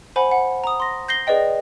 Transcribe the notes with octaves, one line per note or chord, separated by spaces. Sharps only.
C5 F#5 G#5 B5
F#5
A#5 D#6
C6 A#6
G6 A#6 C7 G7
G#4 B4 D5 D#5 G5